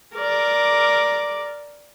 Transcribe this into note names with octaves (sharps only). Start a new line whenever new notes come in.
A#4 D5